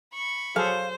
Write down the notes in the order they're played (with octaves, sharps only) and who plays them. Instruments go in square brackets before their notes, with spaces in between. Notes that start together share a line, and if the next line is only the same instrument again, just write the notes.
[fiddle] B5 C#6
[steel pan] F#3 G#4 A4 [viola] C5 [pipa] F5